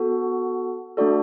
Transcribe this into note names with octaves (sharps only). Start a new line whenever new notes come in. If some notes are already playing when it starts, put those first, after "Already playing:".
Already playing: B3 F#4 A4
A3 D4 F#4 A4 D5